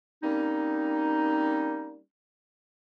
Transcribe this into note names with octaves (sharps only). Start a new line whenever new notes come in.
G3 A#3 C4 C#4 D#4